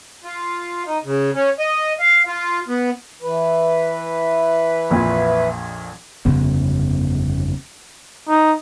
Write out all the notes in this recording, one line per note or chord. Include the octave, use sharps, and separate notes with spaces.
F4
D#4
C#3
C#4
D#5
F5
F4
B3
E3 B4
A#1 F2 A#2
G1 F2 C#3 B3
D#4